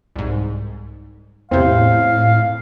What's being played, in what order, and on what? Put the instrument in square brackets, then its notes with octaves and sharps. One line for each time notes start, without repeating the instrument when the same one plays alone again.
[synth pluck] C2 G#2
[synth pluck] E2 C3 [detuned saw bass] A2 [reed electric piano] C4 E4 G6 [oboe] F5